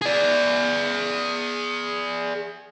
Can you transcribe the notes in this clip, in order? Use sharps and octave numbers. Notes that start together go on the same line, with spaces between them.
G#4 D5